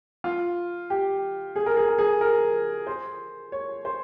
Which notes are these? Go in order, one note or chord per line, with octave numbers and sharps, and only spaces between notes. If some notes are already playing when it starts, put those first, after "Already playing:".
F4
G4
G#4
A#4
G#4
A#4
G#4
A#4
C5
C#5
C5